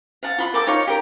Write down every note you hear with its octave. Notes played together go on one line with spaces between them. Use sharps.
F5 F#5 A5
F4 B5 C6
A4 A#4 G5 D6
D#4 F4 C#5 F5
G4 A#4